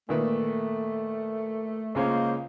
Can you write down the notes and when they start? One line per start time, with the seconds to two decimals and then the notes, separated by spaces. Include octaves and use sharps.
0.09 A#2 D#3 A3 B4
1.95 C#2 G#3 A#3 C#4 C5